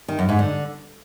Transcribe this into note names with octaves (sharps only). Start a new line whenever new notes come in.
D#3
F#2
G#2
D3